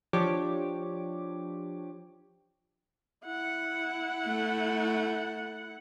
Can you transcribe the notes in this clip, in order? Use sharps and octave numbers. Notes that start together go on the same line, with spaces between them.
F3 D4 G4 C#5 D6
E4 F#5
A3